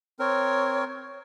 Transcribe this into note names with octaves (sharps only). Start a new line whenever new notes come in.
C4 A#4 C#5